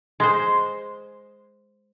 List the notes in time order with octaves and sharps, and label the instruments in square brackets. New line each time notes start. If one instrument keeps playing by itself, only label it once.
[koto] G#3 C5